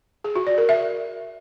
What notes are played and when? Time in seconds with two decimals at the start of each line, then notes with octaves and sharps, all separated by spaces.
0.24 G#4
0.36 F#4
0.47 D5
0.58 A#4
0.69 E5